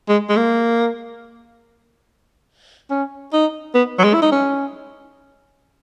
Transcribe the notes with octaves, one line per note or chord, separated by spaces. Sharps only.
G#3
G#3
A#3
C#4
D#4
B3
F#3
G#3
E4
D#4
C#4